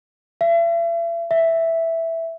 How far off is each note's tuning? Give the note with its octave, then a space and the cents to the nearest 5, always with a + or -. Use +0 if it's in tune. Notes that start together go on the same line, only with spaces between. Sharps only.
E5 +40
E5 +0